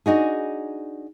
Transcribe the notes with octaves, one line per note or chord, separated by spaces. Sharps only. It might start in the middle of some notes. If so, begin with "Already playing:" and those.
D4 D#4 F#4 G#4